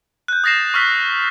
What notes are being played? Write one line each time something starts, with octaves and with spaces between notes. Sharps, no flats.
F#6 G6
D#6 A6 A#6 C7 E7
C#6 E6 F6 B6